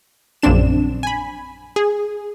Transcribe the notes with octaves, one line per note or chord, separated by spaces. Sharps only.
A#1 F#2 C#3 C4 D4 E7
G#5 B5
G#4